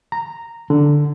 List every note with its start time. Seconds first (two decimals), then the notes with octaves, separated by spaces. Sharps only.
0.12 A#5
0.70 D3